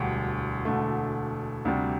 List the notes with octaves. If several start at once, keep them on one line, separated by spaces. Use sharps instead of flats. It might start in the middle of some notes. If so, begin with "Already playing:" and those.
Already playing: E1 D2 D3 G3
E1 D2 D3 A3
D2 C3 G3